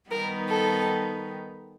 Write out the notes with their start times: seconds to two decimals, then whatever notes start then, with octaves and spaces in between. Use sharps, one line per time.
0.10 D#3 G3 B3 D#4 A#4
0.49 A4